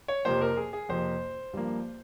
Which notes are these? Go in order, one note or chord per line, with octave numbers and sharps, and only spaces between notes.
C#5
F2 C3 F3 A#3 C5
A#4
G#4
G#4
F2 C3 F3 A#3 C5
G2 F3 A#3